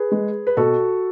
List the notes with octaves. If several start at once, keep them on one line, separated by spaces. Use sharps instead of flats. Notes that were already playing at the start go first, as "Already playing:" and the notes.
Already playing: G#4 B4
G#3
B4
B2 F#4 A4